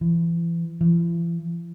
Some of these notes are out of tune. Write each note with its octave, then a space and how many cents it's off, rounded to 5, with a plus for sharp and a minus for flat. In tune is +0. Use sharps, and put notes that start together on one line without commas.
E3 +35
E3 +45